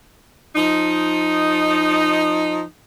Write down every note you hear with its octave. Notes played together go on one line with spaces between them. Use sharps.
F3 D#4